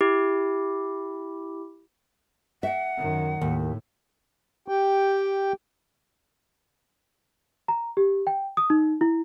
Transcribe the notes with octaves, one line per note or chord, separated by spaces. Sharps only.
E4 G4
E5 F#5
F#2 D#3
D#2 A2
G4 G5
A#5
G4
G5
D#6
D#4
E4